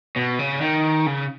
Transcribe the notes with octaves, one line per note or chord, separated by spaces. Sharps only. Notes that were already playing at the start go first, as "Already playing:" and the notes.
B2
C#3
D#3
C#3